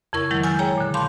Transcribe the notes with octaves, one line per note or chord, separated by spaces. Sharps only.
F2 C#3 E4 A#4 C#6
D#3 F#3 G#3 E4
G#5 E6 F6 G6 A6
G#4 C#5 G5 A#5
A#2 D3
F5 A5 B5 C6 D6 G6